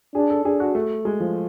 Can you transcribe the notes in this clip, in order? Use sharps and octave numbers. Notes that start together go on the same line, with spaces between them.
D4 G#4
A4
D4 G#4
F#4
A3
G#3
F3